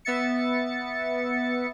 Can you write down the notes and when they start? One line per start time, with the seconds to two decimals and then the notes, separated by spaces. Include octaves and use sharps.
0.05 B3 E5 A6 C#7